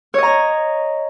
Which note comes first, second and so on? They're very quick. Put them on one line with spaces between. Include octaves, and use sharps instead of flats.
C#5 D#5 A#5